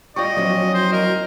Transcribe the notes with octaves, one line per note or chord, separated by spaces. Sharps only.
G3 F4 D5 D#5 G5 C#6
E2 F3 F#3 C#4
C5
A#4 D#5